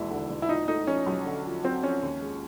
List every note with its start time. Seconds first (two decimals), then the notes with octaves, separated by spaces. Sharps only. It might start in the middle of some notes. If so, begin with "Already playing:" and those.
Already playing: E1 D#2 E4
0.11 D3
0.30 E1
0.42 E4
0.49 A#2 D#4
0.68 A3 D#4
0.87 F3 C#4
1.06 B1
1.25 D3
1.45 F2
1.63 F#3 C4
1.83 F2 C#4
2.03 D#2
2.21 G#3